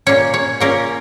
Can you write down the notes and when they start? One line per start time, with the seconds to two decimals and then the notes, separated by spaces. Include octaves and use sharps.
0.06 A#2 A#3 C#4 C#5
0.34 C#5
0.60 A#2 A#3 C#4 A#4